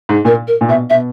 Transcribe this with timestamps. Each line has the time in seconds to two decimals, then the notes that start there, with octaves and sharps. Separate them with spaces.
0.09 G#2
0.25 A#2 A#4
0.48 A#4
0.61 A#2
0.69 B2 E5
0.90 B2 E5